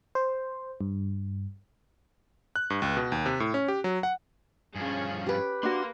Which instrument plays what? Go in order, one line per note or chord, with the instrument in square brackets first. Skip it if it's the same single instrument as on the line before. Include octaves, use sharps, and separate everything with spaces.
[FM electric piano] C5
G2
[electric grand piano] F#6
G2
C#2
B2
D#2
C3
A2
C#4
G4
F#3
F#5
[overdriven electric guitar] G2 F3 [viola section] C#4 G#4
[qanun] G4 B4
[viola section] A#3 [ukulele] D4 F#4 [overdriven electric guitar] C6